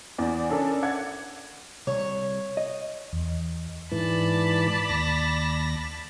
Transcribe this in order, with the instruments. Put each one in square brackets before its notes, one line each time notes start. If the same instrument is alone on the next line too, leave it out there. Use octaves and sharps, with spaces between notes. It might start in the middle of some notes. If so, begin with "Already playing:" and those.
[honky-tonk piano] E2 D5
C#4 D4 A4 A#4
D5 F#5 G#6
[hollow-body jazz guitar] C2 [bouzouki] C#5
[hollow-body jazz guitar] D#5
[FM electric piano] E2
[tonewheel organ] G#2 E3 [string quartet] D5 A5 B5
[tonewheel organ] D#2 A#6